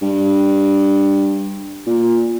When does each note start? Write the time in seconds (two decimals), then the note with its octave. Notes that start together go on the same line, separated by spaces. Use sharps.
0.02 G2
1.86 A#2